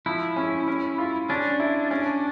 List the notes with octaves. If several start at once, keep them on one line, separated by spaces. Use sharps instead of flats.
F3 E4
C#4
C#4
F4
C#4 D4
E4
C#4